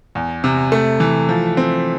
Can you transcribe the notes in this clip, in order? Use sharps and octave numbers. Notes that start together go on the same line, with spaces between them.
E2
C3
A3
E3
F3
C4